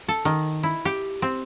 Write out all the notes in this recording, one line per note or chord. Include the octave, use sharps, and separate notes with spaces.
A4
D#3
E4
G4
C4